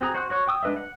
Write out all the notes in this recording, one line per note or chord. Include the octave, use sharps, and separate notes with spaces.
C4 F#4 G#4 A#5
F#4 C5 F#5
F#4 C#5 C#6
G5 D#6 E6
G#3 D4 B4 D#5 E5
F#5